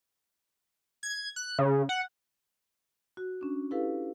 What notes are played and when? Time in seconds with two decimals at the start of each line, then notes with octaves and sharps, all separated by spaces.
1.03 G#6
1.36 F#6
1.59 C#3
1.89 F#5
3.17 F#4
3.41 C#4 D4
3.71 E4 G4 A4 B4 F5